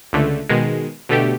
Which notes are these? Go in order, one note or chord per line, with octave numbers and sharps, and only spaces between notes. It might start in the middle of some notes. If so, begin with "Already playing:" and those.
C#2 D3 A3
B2 D#3 G#3
B2 D3 A3 G4